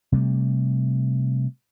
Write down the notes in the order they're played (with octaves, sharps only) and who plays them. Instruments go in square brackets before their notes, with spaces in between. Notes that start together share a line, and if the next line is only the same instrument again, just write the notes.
[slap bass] C3 G3 A3